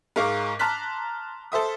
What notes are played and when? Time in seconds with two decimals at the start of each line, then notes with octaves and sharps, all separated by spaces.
0.16 G#2 G#3 A#4 F5 C#6 D6
0.59 A5 A#5 C6 F6 F#6 B6
1.52 A4 C5 E5 D#6